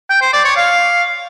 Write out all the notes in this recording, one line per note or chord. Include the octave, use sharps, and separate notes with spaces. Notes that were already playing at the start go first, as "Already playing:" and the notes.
G5
C5
D5
C#5
F5